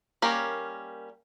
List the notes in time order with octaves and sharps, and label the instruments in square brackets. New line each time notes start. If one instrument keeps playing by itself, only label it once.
[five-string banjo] G3 A#3 C#4 A#4